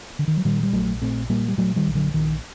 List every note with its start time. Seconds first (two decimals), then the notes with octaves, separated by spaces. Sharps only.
0.19 D3
0.28 D#3
0.37 F#3
0.45 A#2 D#3 G3
0.63 G3
0.73 A#1 F#3 A3
1.02 A#2 A3 C4
1.29 A#2 G3 A#3
1.48 G3
1.57 A#2 F#3 A3
1.76 D#3 G3
1.87 A#1
1.95 D3 F#3
2.14 A#1 D#3